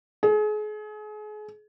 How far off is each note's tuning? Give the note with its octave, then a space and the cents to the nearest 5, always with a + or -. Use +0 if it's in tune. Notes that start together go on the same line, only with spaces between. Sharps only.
G#4 +35